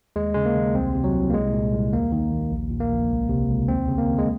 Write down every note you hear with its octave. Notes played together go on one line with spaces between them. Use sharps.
D#2 G#3
C#3 G#3
A#3
D#2
C2 C4
C3
F#3
C2
A#3
C2 G#3
A#2
C2
D#2 A#3
D#3
D#2
A#1
A#2
A#3
A#1
C#2
C3
C#2
D#2 C4
C#3
A#3
D#2
G#3